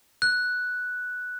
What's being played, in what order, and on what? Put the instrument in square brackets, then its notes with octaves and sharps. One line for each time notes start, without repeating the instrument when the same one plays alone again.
[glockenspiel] F#6